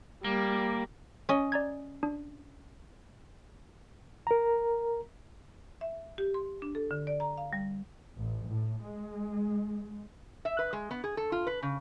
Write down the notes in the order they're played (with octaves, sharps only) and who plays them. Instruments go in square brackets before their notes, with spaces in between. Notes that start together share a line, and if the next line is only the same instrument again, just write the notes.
[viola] G3 [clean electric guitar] A#3
[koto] C#4 D#5
[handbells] D5 A#5 G#6
D4
[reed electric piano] A#4 A#5
[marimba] E5
G4
C6
D4
A4
D3
D5
A#5
F5
G3
[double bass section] A1
A2
G#3
[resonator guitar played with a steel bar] E5
B4
G#3
B3
G#4
A4
F4
B4
C#3